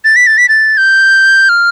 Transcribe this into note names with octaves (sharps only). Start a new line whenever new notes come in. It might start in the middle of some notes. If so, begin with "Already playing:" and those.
A6
B6
A6
B6
A6
G6
F6